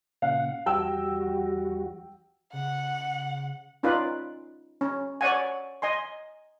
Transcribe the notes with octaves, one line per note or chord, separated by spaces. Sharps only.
A#2 C#3 F5 F#5
E2 G3 F#4 G5 E6
C#3 F#5
C#4 D#4 F4 B4 D5
C#4
C#5 D5 F#5 G#5
D#5 G#5 C6